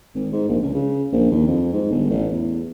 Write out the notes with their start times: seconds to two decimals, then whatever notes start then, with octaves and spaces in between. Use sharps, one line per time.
0.15 G#1
0.32 G#2
0.48 A#1
0.63 C#2
0.74 C#3
1.13 A#1
1.31 D#2
1.47 F2
1.73 G#2
1.91 G1
2.10 A1
2.31 E2